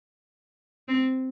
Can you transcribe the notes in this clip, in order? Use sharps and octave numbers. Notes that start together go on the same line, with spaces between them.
C4